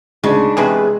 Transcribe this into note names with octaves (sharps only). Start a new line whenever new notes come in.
D2 C#3 G#3 D4 D#4
E2 C3 G#4 B4